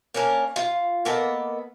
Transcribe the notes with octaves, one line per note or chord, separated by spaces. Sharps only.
A#3 C#4 D4 A#4
F4
A#3 B3 A4 D#5